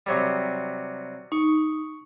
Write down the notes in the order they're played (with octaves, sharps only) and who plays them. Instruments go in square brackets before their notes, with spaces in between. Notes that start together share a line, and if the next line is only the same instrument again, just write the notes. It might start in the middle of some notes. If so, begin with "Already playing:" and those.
[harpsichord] C3 F#3 G3
[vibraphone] D#4 [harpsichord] C#6